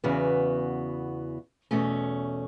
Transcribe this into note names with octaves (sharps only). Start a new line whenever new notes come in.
E2 C#3 E3 B3 F#4
E2 B2 A3 C#4